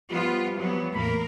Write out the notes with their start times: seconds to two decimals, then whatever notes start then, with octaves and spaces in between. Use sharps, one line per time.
0.11 F3 G3 B3 F4
0.57 E3 F#3 B3
0.94 E2 A2 A#3 A#4 B5